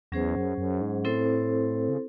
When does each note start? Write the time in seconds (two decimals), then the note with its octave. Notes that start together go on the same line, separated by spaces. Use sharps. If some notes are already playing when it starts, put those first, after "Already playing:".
0.12 E2 F#3 C#4 G#4 C5 F#5
0.36 F#2
0.58 F#2
0.81 G#2
1.05 A2 C4 E4 A4 C5
1.89 C#3